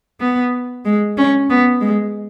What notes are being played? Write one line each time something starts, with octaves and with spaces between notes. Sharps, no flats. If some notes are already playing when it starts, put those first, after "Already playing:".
B3
G#3
C#4
B3
G#3